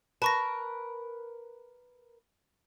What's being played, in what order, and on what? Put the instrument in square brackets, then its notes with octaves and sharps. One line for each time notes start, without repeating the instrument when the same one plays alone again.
[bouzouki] A#4 B4 [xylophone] A5 C#6 A#6